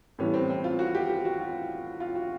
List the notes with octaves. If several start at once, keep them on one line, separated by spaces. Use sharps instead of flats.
A2 E3 G3 B3 C#4
C4
C4
F4
F#4
G4
G4
F#4
F4
F4
F#4